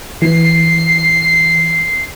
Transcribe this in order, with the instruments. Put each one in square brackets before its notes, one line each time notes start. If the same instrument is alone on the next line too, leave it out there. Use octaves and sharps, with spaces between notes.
[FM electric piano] E3 [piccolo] C7